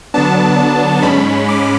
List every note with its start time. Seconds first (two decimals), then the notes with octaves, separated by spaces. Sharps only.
0.14 D3 F#3 B3 D4 A5
1.02 G#2 G#3 C#4 B5
1.48 D6